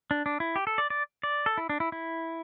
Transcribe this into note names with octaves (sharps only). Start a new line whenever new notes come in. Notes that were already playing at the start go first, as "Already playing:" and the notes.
D4
D4
E4
G4
A4
D5
D5
D5
A4
E4
D4
E4
E4